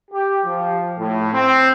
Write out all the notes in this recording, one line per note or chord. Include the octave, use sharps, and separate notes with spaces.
G4
F3
A2
C4